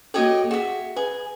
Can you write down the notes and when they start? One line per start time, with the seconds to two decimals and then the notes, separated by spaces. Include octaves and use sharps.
0.14 A#3 F#4 G4 A4 C#5 D#5
0.51 F#4 G#4 E5
0.97 G#4 B4